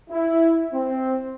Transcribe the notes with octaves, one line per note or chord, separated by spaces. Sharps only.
E4
C4